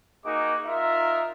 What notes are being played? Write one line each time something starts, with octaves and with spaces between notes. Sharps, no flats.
A#3 D#4 F#4 G#4 D#5 D6
D#4 F4 A#4 E5